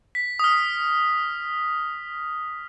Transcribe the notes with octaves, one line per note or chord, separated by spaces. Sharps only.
B6
D#6
F6